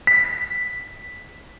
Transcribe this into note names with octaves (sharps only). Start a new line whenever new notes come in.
B6